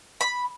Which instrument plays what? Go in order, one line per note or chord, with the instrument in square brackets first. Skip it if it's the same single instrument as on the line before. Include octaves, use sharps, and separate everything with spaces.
[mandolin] B5